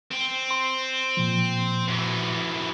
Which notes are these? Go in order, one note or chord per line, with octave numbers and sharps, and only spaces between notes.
C4
C6
A#2 F3
F#2 E3